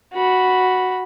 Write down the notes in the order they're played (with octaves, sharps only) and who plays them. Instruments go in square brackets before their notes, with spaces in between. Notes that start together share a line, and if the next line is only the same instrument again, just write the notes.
[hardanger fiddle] F#4 B5